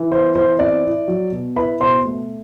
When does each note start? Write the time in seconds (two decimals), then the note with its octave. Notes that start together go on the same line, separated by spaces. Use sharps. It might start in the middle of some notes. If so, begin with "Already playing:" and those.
Already playing: E3
0.11 B3 C5
0.35 E3 C5
0.59 C4 D5
0.84 E4
1.08 F#3
1.32 B2
1.56 E4 B4 B5
1.80 B2 C5 C6
2.05 A3